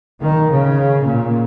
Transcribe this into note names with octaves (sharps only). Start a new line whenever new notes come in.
D#3
C#3
A#2